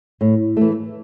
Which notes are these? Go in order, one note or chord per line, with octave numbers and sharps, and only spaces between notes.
A2
E3 A3